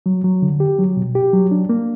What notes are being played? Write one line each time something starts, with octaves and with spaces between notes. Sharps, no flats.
F#3
F#3
D3
G4
F#3
B2
G4
F#3
D4
A#3